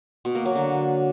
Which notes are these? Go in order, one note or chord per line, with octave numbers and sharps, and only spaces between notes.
B2
A#3
F#3
D3